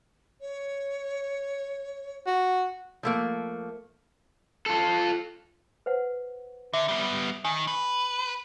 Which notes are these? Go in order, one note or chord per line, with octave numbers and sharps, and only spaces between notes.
C#5
F#4
F3 A3 A#3
F4 A4
B4 C5 F#5
D3 E5 A#5
G3 B3
D#3 G#5
B4